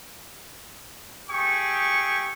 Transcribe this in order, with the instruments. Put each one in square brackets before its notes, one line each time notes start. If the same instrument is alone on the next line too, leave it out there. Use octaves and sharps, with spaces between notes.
[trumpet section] A3 G4 G#4 C#6